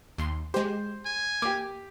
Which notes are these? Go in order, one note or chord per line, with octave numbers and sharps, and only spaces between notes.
D#2 C6
G#3 G4 C5
G#5
A#3 G4 D6